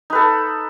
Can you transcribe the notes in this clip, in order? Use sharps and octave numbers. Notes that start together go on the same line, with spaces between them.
D#4 A4 B4